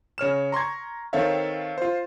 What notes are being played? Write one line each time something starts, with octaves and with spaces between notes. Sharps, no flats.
C#3 C#5 F6 E7
A#5 C6 C#6 G#6
D#3 C4 A4 C#5 E5 F5
F4 C5